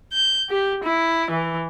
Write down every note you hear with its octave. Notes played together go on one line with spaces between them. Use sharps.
G6
G4
E4
E3